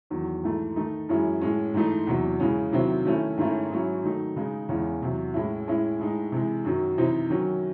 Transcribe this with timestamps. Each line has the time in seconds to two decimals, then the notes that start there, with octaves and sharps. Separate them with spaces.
0.10 E2 D#3 F#3
0.44 G#2 E3 A3
0.76 D#3 A3 D#4
1.09 F#2 E3 G#3 C#4 E4
1.41 A2 G#3 C#4
1.74 G#2 E3 A3 D#4
2.07 E2 C3 F#3
2.40 C#3 E3 G#3 C#4
2.72 C3 D#3 F#3 C4 E4
3.05 D#3 A3 C#4 E4
3.38 G#2 D#3 A3 C#4 E4
3.71 G#2 F#3 C#4 E4
4.03 D#3 F#3 A3 D#4
4.36 C#3 G#3 D#4
4.69 E2 C#3 G#3 C#4 E4
5.01 E2 C3 F#3
5.34 A2 G#3 C#4 E4
5.67 A2 G#3 C#4 E4
5.99 A2 G#3 D#4
6.32 C3 E3 G#3
6.65 F#2 D#3 F#3
6.98 C3 E3 C4 D#4
7.30 D#3 F#3 C#4